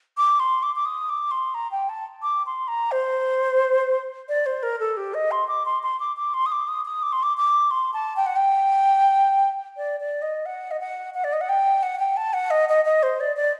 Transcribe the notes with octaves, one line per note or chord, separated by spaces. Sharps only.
D6
C6
D6
D6
D#6
D6
C6
A#5
G5
A5
D6
C6
A#5
C5
D5
C5
A#4
A4
G4
D#5
C6
D6
C6
C6
D6
D6
C6
D#6
D6
D#6
D#6
D6
C6
D6
D6
C6
A5
G5
F#5
G5
D5
D5
D#5
F#5
D#5
F#5
F#5
D5
D#5
F#5
G5
F#5
G5
A5
F#5
D#5
D#5
D#5
C5
D5
D5